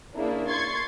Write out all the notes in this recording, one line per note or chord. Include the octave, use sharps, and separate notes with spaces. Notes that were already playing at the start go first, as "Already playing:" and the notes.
C#3 A#3 D4 E4
C6 C#6 G#6 A6 C7